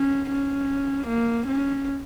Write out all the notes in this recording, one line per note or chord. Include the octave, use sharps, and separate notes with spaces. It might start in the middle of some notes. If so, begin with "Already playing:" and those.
Already playing: C#4
C#4
A#3
C#4